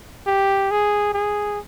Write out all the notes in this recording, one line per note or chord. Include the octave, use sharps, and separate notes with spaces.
G4
G#4
G#4